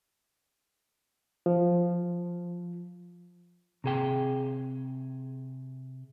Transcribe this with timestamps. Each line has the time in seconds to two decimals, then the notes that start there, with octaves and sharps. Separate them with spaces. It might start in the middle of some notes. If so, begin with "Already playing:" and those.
1.46 F3
3.84 C3 G#4 G5